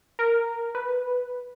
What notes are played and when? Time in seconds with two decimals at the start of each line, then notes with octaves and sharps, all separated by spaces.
0.19 A#4
0.75 B4